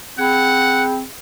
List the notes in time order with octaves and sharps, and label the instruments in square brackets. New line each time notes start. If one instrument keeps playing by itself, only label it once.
[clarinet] C4 [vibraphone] G#4 B5 [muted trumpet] F#5